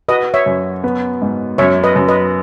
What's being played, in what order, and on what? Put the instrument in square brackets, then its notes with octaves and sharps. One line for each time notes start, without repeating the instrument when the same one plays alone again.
[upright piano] F#4 [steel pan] B4 D#5
[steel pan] C#5 E5
[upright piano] F#2
B3
G#2
[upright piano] F#2 [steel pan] C#5 E5
[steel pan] B4 D#5
[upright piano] F#2
[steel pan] B4 D#5